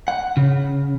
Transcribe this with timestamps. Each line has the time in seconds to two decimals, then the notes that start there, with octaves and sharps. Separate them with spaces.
0.08 F#5
0.37 C#3